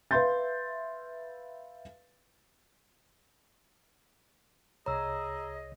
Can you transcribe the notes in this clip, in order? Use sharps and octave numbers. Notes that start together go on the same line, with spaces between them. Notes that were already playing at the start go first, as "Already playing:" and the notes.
B4 E5 F5 C6 G6 A6
C2 G#4 C#5 D#5 A#5 E6